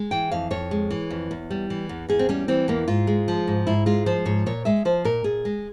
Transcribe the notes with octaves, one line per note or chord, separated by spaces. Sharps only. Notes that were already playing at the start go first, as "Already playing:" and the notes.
Already playing: G#3
E3 G5
F2 F5
F2 C#5
G#3
E3
F2
E2
G3
E3
E2
E2 G#4
C4
G3 C#4
E3 C4
E2 A#3
G#2 F4
G#3
F3
G#2
G#2 E4
G#3 F4
F3 C5
G#2 C#5
A#2 C#5
G#3 E5
F3 C5
A#2 A#4
A#2 G#4
G#3